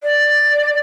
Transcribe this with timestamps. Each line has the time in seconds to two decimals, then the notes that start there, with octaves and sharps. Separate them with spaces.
0.03 D5